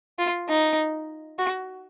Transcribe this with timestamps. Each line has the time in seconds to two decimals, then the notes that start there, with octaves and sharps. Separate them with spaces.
0.19 F4
0.49 D#4
1.39 F#4